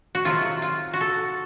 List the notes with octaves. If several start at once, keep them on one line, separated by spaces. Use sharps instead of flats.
F#4
C3 D#3 F#3 A3 F4
F4
F#4
A4